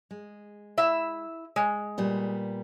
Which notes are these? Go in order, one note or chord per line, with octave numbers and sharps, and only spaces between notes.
G#3
E4 E5
G#3
A#2 G3 B3